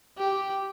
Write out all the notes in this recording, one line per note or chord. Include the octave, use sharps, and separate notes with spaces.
G4